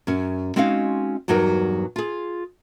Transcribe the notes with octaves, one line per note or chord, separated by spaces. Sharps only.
F#2 C#4
G#3 C4 C#4 D#4 F#4 F5
E2 G2 F#3 D#4 F#4 A#4
F4 G#4